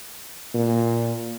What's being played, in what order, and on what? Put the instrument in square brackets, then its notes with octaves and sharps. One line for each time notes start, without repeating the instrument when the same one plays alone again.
[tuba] A#2